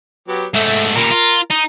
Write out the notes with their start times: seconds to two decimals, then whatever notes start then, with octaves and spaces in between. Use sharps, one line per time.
0.28 F#3 B3 G4
0.54 G#2 A3 A4 E5
0.95 A#2 G3 A#4 A#5
1.11 F4
1.51 D#4